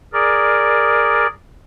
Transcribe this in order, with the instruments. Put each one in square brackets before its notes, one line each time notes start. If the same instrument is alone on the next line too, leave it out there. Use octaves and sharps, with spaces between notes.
[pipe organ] G#4 A#4 D5